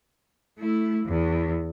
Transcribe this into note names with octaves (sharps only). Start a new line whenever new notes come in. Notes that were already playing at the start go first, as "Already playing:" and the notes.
A3 E4
E2